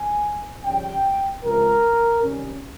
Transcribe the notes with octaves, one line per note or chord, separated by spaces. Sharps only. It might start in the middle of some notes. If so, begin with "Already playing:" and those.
Already playing: G#5
F2 C#3 G3 C#4 G5
C#2 C3 F3 A#4
C3 D#3 G3 C#4